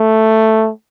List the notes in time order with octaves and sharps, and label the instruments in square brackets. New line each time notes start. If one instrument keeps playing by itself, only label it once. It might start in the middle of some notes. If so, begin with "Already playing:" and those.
Already playing: [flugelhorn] A3